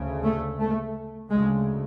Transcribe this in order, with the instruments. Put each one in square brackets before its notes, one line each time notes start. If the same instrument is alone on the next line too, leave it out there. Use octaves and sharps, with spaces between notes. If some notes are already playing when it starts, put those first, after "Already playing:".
Already playing: [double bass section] D2 C#3
A3
A3
D2 C#3 G#3